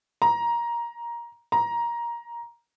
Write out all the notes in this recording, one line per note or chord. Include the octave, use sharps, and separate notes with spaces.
A#5
A#5